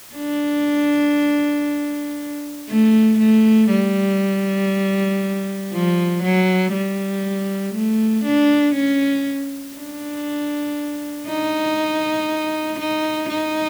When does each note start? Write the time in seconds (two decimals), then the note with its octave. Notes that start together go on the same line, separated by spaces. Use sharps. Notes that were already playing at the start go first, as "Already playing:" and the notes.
0.16 D4
2.69 A3
3.19 A3
3.69 G3
5.72 F3
6.23 F#3
6.72 G3
7.74 A3
8.24 D4
8.75 C#4
9.75 D4
11.28 D#4
12.79 D#4
13.29 D#4